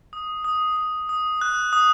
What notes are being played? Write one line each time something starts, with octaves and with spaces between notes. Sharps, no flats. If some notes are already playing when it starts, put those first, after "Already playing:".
D#6
D#6
D#6
D#6
F#6
D#6